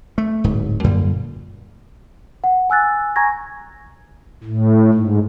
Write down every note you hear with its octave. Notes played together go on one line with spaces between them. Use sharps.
A3
D1 G#2
F#2 A#2 D3 G3
F#5
G#5 E6 F#6 A6
G#5 A#5 C#6 G#6 A#6
A2
G#2